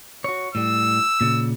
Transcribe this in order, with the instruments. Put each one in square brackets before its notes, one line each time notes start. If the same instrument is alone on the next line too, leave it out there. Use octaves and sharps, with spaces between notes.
[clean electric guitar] F#4 C#5
[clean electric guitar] A2 G3 [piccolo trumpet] E6
[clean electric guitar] A#2 C#3